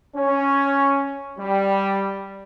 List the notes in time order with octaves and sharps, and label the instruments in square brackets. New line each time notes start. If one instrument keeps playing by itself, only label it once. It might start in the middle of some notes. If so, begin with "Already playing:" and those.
[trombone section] C#4
G3